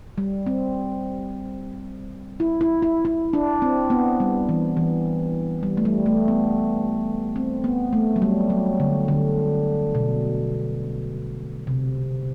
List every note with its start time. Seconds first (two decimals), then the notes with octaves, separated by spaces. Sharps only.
0.18 G3
0.47 C4
2.40 E4
2.61 E4
2.83 E4
3.05 E4
3.33 D4
3.62 C4
3.90 B3
4.20 G3
4.49 E3
4.77 E3
5.63 G3
5.77 A3
5.85 G3
6.06 A3
6.28 B3
7.36 C4
7.64 B3
7.93 A3
8.16 F#3
8.22 G3
8.50 F#3
8.80 D3
9.08 D3
9.95 B2
11.67 C3